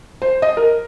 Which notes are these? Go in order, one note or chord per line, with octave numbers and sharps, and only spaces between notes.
C5
D#5
A#4